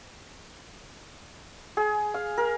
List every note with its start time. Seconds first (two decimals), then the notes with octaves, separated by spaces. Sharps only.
1.77 G#4
2.14 F5
2.38 A#4